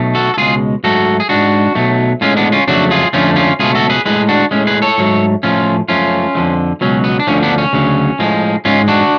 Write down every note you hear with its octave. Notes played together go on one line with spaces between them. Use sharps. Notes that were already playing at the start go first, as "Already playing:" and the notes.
Already playing: B1 B2 A3
F#4 A4
A4
C#2 B2 G#3 F4 G#4
G#2 F#3 A3 F#4 A4
G#4
G#2 G#3 D4 F#4
B1 B2 F#3 A3
A2 G#3 C#4 F4
B3 D4
C#4 F4
F2 C#3 F#3 A3 D4 F#4
F4 G#4
F2 D3 F3 A3 C#4 F4
C#4 F4
C#2 B2 A3 F4 G#4
F#4 A4
G#4 B4
A2 G#3 G#4 B4
D4 F#4
A2 G#3 C#4
G#4 B4
A4 C#5
G#2 F#3 A3
A2 F3 A3 C#4 F4
F#2 F3 A3 C#4 F4
F2 D3 F3 A3
C#2 B2 F#3 C#4
B3
D4
D2 D3 F3 C#4
B3 D4
C#4
D2 C#3 F#3
A2 F3 G#3
G#2 G#3 C#4 F4
D4 F#4